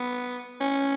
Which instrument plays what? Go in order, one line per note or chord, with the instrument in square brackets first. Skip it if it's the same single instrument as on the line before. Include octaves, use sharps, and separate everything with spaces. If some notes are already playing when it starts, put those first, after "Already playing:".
Already playing: [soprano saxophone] B3
C#4